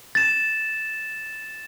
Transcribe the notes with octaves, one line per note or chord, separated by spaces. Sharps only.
A6 E7